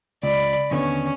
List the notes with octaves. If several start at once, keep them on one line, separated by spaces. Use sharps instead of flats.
C#2 D5 B5
D#2 D3 B3 C#4